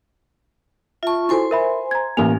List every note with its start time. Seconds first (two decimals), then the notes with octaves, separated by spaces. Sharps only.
1.03 F4 E5 A5 C#6
1.29 E4 F#4 A4 C5 G#5 C6
1.51 A#4 E5 B5
1.91 A#5 G#6
2.17 A1 A#3 G#5 F7